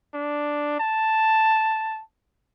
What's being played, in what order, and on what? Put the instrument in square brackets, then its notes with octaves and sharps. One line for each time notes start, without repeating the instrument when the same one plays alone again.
[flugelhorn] D4
A5